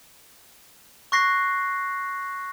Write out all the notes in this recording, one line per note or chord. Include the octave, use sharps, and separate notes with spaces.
C#6 F#6 A#6 C7